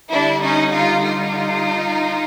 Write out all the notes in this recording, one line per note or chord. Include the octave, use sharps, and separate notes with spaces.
D3 G3 D4 E4
C#4 D#4
D#4 F4
D#4 F4